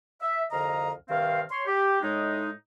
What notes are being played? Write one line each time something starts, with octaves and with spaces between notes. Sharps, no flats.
E5
C2 F2 D3 D#5 F5 A#5
G2 C3 D#3 C4 F5
C#5 C6
G4
A2 G#3 D#4